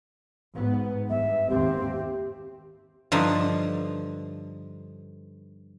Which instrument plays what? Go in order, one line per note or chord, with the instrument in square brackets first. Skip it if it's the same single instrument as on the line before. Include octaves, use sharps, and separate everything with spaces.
[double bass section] G#2 B3
[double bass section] G2 [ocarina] E5
[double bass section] D#2 G#2 C4 [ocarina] G4
[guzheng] G2 D3 F3 D#4